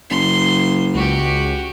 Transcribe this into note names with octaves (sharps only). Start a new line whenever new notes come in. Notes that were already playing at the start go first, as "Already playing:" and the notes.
F#1 C6
C#2 F#4 G4